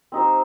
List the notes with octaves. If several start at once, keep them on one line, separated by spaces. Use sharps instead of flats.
C4 D#4 G4 C5